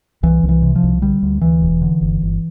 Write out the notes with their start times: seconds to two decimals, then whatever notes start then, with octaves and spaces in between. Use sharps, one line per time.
0.23 C2 E3
0.43 C2
0.49 E3
0.62 C3
0.76 F3
0.83 C2
1.02 D3 G3
1.23 D2
1.41 D2 E3
1.62 E1
1.82 D3
2.01 G1
2.22 G1